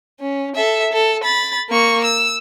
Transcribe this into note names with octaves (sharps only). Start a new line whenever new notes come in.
C#4
A4 E5
A4
B5 A6
A#3 C#6
E6